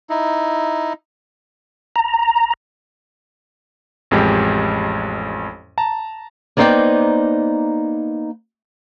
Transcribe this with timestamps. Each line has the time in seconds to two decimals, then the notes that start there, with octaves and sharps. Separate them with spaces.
0.10 D#4 E4
1.96 A#5
4.11 A1 F2 G#3 G4
5.78 A5 A#5
6.57 A#3 B3 D#4 C5 D5 G5